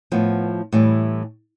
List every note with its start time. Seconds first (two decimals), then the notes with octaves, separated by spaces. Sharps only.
0.12 A2 F3 B3
0.72 A2 E3 G3